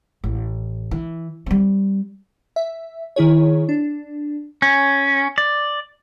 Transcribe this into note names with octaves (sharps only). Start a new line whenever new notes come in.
A1
E3
G3 C4
E5
D#3 E4 G#4 C#5
D4
C#4
D5